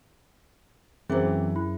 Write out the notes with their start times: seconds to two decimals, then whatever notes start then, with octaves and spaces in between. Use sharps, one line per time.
1.10 F#2 E3 F#3 C4 G#4 A#4 C5
1.56 E4